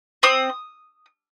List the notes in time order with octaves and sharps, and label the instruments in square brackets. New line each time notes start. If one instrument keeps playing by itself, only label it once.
[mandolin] C4 D#6